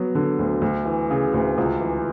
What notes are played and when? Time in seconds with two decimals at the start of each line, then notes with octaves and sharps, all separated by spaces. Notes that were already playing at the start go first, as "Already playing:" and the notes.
Already playing: F#3 B3
0.15 D3
0.39 D2
0.62 D2
0.85 E3
1.10 C#3
1.34 D2
1.58 C#2
1.81 E3